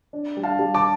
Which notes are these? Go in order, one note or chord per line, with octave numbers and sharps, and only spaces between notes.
D4
G3
F5 A5
G3
A5 D6